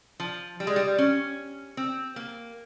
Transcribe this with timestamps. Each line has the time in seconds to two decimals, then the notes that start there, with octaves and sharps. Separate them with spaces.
0.20 F3
0.60 G3
0.67 G#3
0.76 G3
0.98 C#4
1.77 C4
2.16 A#3